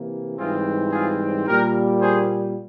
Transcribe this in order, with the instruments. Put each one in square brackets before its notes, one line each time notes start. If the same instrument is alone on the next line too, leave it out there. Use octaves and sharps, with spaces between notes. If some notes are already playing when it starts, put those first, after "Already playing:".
Already playing: [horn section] C3 E3 A#3
G#2 E3 G3 C4 F4 G#4
F4 G#4
A#2 G3 A#3 G4 A#4
G#4 C5